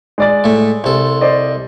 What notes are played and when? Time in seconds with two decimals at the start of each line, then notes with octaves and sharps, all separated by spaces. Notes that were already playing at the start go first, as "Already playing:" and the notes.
0.18 G#3 D5 A6
0.44 A2 A3
0.84 C2 A4
1.21 C5 D5 D#5